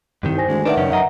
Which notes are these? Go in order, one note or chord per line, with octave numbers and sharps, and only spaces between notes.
C2 G2 D#3
C5 G#5 A#6
D2 G#3
D#3 D4 G4 B4 D5 E5 F#5
F#2 C#3 C#4
F#2 D#5 E5 F#5 A#5